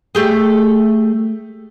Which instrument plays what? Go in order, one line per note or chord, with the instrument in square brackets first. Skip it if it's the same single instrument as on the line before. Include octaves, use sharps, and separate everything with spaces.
[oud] A3 G4 G#4